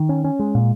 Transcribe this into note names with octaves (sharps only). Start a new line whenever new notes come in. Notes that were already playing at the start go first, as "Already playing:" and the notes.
Already playing: D#3
C#4
C#4
G#3
A#2